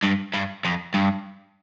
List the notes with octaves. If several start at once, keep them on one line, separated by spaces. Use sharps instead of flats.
G2
G2
F2
G2